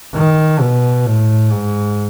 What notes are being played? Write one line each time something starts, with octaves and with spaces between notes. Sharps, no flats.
D#3
B2
A2
G#2